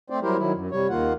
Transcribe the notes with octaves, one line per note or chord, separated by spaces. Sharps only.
A3 C4 C5 D5
F#3 G3 E4 G4 A#4 C5
D#3 F#3 E4
F#2
C3 G3 C#5
D#2 D#3 A#3 F4 F#5